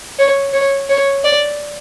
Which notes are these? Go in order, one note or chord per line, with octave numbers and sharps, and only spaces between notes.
C#5
C#5
C#5
D5